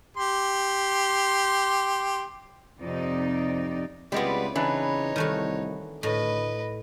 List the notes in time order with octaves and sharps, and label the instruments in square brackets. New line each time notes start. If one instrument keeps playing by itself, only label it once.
[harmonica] G4 C6
[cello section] F2 C3 D#4 D5
[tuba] C#2 [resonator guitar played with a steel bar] G3 G#3 B3 [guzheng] C4 E4 [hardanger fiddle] B4 D5
[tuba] C#3 [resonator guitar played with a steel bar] E3 D4 B4 [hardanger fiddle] D#4 C#5
[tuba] C2 [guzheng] D#3 A3 F#4
[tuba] D2 [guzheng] A2 [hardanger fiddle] B4 D#5